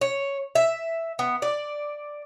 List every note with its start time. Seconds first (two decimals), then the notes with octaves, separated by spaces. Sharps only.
0.01 C#5
0.55 E5
1.19 B3
1.42 D5